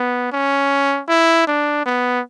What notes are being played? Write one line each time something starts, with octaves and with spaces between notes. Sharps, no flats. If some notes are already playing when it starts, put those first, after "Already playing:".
Already playing: B3
C#4
E4
D4
B3